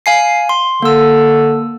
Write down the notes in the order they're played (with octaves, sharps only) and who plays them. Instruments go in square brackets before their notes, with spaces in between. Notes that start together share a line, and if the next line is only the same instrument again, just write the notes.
[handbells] F5 G#5 C7
C6
[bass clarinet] D3 [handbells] A#3 E6